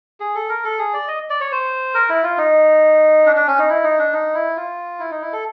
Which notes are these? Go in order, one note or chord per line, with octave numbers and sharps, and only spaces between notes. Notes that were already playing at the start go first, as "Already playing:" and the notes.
G#4
A4
A#4
A4
G#4
D5
D#5
D5
C#5
C5
A#4
E4
F4
D#4
D4
D4
C#4
D#4
E4
D#4
D4
D#4
E4
F4
E4
D#4
E4
A4